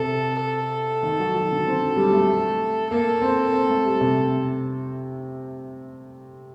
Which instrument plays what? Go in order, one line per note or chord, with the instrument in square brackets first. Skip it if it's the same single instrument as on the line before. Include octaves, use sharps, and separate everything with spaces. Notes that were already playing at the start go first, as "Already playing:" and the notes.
Already playing: [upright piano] C3 [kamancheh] A4
[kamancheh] A4
[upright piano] D#3
F#3
F#3
D3
C4
F#3
G3
A3
[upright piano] A#3 [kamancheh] A4
[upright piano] C4
C4
A3
G3
C3